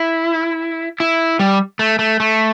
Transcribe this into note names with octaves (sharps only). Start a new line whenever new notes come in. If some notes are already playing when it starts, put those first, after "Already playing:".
Already playing: E4
E4
G3
A3
A3
A3